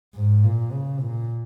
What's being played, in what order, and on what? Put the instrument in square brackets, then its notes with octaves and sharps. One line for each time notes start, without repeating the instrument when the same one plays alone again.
[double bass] G#2
A#2
C#3
A#2